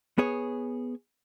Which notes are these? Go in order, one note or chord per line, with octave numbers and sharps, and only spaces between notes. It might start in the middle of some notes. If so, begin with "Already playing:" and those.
B3 G#4 C#5